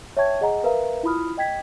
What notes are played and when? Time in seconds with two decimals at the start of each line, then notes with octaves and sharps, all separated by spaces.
0.17 C#5 E5 G5 A5 C#6 G#6
0.41 G#4 D#5 F#5 G#5 A#5
0.64 A#4 B4 E5 F5 A#5
1.03 E4 F4 B5 D#6 F6
1.37 D#5 G5 G#6 B6